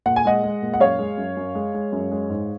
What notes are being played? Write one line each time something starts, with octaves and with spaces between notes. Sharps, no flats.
A#2 F#5
G#5
G#3 D#5 F#5
G#3
A#2
F#5
F#2 C#5 F5
G#3
F#2
F#2
G#3
G#3
F#2
G#3
G#2